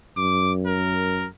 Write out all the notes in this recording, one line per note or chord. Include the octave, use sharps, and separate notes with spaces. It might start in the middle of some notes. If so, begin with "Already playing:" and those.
F#2 D6
A#4